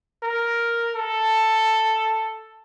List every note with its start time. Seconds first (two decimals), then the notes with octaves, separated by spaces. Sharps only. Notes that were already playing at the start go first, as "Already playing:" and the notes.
0.23 A#4
0.95 A4